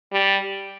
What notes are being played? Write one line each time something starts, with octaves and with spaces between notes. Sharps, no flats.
G3